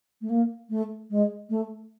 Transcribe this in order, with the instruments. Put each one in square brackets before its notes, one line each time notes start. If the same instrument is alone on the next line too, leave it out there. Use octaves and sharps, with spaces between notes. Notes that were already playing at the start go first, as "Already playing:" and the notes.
[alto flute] A3
A#3
A3
G#3
A3